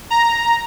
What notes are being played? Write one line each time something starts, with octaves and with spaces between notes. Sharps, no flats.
A#5